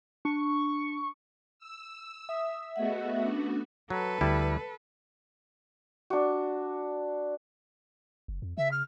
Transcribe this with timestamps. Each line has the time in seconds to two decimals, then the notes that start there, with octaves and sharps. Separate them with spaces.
0.25 D4 C#6
1.59 E6
2.29 E5 D#6
2.76 A3 B3 F#4 G#4 D#5 F#5
3.23 C#4 D4
3.90 F#3 A4 B4
4.21 D2 G3 E4
6.10 D4 F#4
8.28 F#1
8.42 F2
8.57 C#3 E5
8.71 F6